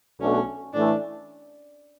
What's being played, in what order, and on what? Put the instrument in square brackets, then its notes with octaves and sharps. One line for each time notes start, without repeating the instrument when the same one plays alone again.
[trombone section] B1 B2 A3 D4 F#4 [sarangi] C#4
[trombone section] A2 E3 A3 [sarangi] D4